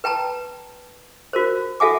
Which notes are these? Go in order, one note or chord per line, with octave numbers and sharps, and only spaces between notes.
B4 G5 A5 A#5
F#4 A#4 C5
F#4 A4 E5 F#5 G#5 D6